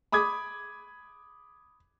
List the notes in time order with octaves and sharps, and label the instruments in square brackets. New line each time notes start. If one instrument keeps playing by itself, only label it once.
[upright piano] B5 D6 D#6 G#6